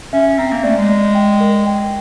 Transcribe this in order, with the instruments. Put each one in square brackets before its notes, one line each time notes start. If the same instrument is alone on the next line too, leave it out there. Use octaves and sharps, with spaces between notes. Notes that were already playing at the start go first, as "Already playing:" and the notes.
[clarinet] C#4 [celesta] E5
[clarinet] C4 [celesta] A#5
[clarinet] A#3
[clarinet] A3 [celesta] D5
[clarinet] G#3
[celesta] D5
G5
A#4
G5